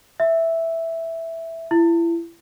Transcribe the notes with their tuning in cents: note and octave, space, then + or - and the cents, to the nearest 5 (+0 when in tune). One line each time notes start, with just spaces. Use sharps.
E5 +0
E4 +30